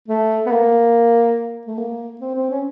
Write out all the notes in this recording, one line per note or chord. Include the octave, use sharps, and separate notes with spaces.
A3
B3
A#3
A3
A#3
C4
C4
C#4